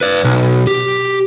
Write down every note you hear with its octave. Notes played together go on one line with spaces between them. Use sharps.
B4 D5
B1
G4